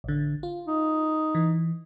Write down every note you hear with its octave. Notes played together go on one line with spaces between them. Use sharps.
A1 D3
F4
D#4
E3